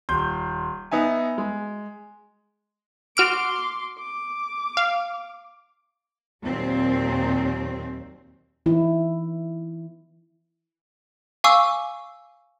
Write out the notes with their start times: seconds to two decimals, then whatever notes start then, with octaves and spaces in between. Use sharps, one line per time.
0.09 D#1 C6 G6
0.91 B3 D#4 E5 G#5
1.38 G#3
3.17 F#4 C6 D6 F6 D7
3.99 D6
4.77 F5
6.44 D#2 A#2 F#3 C4
8.66 E3 D#4 E4
11.44 F5 G#5 C#6 D6 E6